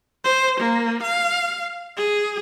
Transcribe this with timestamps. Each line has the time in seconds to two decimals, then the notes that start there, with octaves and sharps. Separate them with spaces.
0.24 C5
0.60 A#3
1.02 F5
1.97 G#4